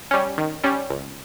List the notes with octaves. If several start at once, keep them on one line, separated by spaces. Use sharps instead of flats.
G3 C#4
D#3
G3 C#4
C#2